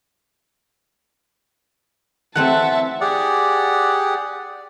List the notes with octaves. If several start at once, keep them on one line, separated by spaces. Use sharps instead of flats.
E3 A3 C4 E5 F#5 A5
G4 G#4 D5 F#5